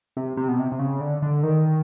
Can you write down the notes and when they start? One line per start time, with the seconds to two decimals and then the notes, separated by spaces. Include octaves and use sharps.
0.17 C3
0.37 C3
0.48 B2
0.59 C3
0.72 C3
0.79 C#3
1.01 D3
1.22 D3
1.43 D#3